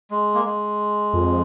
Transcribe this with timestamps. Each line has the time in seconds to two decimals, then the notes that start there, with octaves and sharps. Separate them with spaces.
0.11 G#3
0.35 A#3
0.45 G#3
1.13 F2